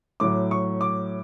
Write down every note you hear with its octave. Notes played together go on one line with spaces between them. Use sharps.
A2 F#3 D6
C#6
D6